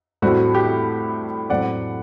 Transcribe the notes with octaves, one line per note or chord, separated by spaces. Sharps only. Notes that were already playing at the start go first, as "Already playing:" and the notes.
A2 G3 C4 F#4
G4
A2 F#3 C4 D5 F#5